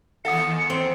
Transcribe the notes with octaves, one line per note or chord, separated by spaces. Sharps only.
D#2 A4 F5 F#5 D#6 C#7
C4